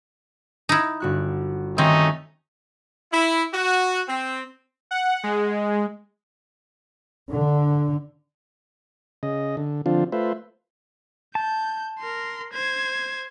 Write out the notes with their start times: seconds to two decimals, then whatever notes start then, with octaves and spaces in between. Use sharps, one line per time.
0.69 D#4 E4
1.00 G1 F#4 F#6
1.78 D#3 A3 C4 C#4 D#4
3.12 E4
3.54 F#4
4.09 C4
4.91 F#5
5.24 G#3
7.34 D3
9.23 C#3 D#5
9.57 D3
9.86 D3 F3 C4 D4 F4
10.12 A3 F4 B4 C5 E5
11.35 A5 G6
11.99 A#4 C6
12.53 C5 G#6